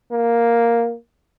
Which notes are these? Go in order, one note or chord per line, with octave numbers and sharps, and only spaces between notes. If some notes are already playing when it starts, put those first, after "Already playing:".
A#3